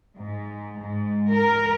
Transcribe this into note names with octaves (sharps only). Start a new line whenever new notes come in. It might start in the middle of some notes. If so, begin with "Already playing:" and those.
G#2
G#2
A#4